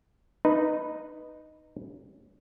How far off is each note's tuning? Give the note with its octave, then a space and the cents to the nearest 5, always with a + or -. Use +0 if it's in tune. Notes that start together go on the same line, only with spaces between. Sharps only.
D#4 -10 B4 +0